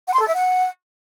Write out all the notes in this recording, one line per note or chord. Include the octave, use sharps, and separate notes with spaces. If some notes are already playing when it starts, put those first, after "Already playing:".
F#5
C6
A4
E5
F#5